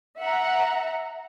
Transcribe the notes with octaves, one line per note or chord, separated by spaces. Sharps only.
E5 F#5 A#5